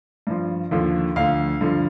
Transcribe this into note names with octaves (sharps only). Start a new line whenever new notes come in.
G2 F3
D#2 D3 F3
D2 D3 F3 F5
G2 D3 F3